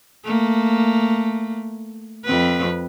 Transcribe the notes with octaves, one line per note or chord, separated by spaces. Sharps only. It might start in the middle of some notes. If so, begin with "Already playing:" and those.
A3 A#3
F2 C4 B4